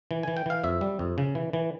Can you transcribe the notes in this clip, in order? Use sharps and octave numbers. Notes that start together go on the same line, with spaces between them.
E3
E3 G#5
G5
E3 F5
F2 E5
G3
F2
C#3
E3
E3